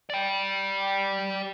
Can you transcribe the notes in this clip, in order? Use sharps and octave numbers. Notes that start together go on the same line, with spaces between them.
D5 G5